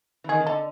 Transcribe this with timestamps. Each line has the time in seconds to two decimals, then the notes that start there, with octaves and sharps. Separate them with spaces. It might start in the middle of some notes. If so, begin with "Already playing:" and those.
0.24 E3
0.29 D#3 G#4
0.40 D#3
0.47 D3 A4